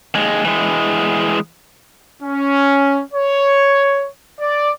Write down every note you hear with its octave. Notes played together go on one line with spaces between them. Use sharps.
D#2 G#3
E3 G#3
C#4
C#5
D5